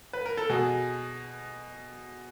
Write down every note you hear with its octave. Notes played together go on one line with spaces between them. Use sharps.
B4
A#4
A4
B2 F#4 G#4